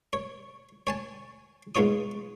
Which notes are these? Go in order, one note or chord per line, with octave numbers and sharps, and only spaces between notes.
C#5
C#5 G#5 A5
G#2 B3 F4 C#5 D#6